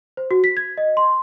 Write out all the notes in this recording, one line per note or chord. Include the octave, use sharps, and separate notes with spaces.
C5
F#4
B6
G#6
D#5
C6